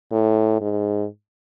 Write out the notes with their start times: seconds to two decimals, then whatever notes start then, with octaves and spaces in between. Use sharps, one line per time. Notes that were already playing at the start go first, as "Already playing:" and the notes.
0.12 A2
0.61 G#2